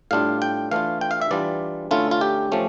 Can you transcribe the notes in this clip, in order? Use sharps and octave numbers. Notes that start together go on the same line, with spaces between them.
A2 G3 D4 F4 F5
G5
E3 A3 D4 F4 F5
G5
F5
E5
E3 G3 D4 F4 D5
D3 A3 C#4 E4 F4
F4
G4
F3 A3 C#4